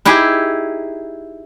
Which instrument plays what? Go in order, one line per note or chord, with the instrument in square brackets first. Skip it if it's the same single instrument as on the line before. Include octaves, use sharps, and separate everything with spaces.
[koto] D#4 E4 G4 G#4